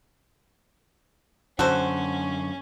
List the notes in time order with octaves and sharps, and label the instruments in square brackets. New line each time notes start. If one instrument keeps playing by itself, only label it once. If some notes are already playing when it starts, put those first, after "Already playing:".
[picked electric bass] F#2 D3 [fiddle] C#4 [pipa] F#4 A4 C5